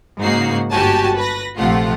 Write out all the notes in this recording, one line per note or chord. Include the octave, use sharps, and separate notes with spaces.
G#2 C#3 A#3 D#4 F#4 C7
G1 F#4 G4 G#5 A5
B4 A#6
A#1 C3 F3 A3 F4 F#5